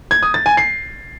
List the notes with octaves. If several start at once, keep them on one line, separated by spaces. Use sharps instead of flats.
G#6
D#6
A6
G#5
C7